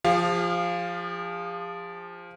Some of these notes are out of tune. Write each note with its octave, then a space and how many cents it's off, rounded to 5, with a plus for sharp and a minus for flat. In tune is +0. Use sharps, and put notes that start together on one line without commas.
F3 +0 G#4 -45 F5 +0